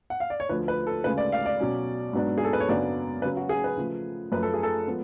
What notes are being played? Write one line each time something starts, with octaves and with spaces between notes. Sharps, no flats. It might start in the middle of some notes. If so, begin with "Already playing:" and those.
F#5
F5
D5
C#5
D2 D3 F3 B4
B4
A4
D2 C#3 G#3 B4
D5
F5
D5
B2 F#3 C#4
G#2 F#3 B3 D4
G#4
A4
B4
C#5
F#2 C#3 F#3 B3 D4 D5
C#3 F#3 C#4 B4
F#4
G#4
B4
C#3 F3 A3
F#2 F3 A3 B4
A4
G#4
A4
F3 G#3 B3